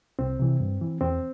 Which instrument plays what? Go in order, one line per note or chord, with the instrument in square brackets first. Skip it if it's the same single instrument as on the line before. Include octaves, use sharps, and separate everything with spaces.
[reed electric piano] C2 C4
C3 E3
G2
E3
E2 C4